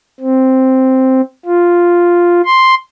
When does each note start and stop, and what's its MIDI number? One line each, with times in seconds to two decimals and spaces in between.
0.20 1.21 60
1.46 2.42 65
2.45 2.75 84